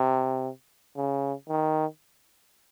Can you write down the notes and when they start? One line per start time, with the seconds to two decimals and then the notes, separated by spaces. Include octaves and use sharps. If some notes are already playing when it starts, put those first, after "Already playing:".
Already playing: C3
0.96 C#3
1.49 D#3